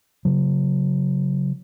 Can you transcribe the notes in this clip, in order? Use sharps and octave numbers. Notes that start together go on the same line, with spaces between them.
C#3 F#3